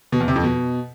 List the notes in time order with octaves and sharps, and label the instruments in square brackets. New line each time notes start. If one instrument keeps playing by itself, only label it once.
[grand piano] B2
E2
C3
F2
B2